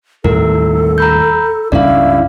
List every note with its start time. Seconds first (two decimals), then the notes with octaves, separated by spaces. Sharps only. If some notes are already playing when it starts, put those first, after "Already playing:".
0.24 D#2 A2 G3 E4 A4 A#4
0.98 A#5 B5 G6
1.72 C#2 G2 C#4 E4 D5 F5